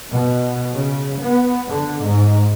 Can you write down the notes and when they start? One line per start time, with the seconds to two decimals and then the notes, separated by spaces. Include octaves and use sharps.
0.11 B2
0.74 C#3
1.22 B3
1.68 D3
2.03 G#2